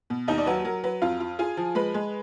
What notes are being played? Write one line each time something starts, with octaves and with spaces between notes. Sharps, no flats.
B2
D#2 D#4 D#5
D5
F#3 B4
F#3 A#4
F#3 B4
F2 F4 F5
F4
F4 G#4 G#5
F3
G#3 B4 B5
G#3